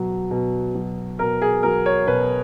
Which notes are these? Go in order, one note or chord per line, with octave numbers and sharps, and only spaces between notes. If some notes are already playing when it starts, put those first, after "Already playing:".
Already playing: B2 F#3
B2
F#3
B2 A#4
G#4
F#3 A#4
C#5
B2 B4